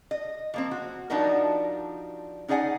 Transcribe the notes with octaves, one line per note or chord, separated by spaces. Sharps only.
D#5
F3 A#3 C4
F#4
F3 G3 D4 D#4 F#4 A#4
C#4 D#4 G#4 D5 F#5 G#5